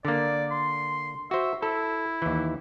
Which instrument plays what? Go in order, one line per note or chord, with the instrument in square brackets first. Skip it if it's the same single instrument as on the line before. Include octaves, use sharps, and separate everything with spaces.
[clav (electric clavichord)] D3 A#3 [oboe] D5
[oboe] C6
[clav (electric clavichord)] F#4 C5 [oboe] E5
[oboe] E4 [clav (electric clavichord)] A4
[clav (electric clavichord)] D#2 E3